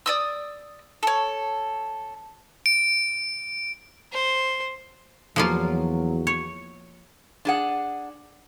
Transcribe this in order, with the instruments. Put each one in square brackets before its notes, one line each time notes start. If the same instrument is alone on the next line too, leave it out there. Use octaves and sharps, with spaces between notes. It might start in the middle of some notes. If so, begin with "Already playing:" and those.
[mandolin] D5 D#6 E6
A4 C#5
[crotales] D7
[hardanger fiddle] C5
[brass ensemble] E2 F#3 [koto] F3 A#3 F4
[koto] C#5
[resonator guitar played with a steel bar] D4 G#4 F#5